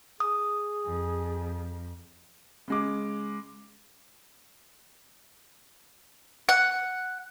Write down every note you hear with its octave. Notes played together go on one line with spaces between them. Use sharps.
G#4 D#6
F2
C#3 G#3 D6
F#5